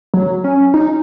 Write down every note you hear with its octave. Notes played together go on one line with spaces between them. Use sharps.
F#3
C#4
D#4